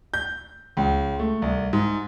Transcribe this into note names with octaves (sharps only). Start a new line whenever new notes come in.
G6
C#2
A3
C2
G#2